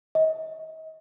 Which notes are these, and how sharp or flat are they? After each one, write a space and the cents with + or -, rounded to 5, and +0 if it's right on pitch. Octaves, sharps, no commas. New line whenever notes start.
D#5 +35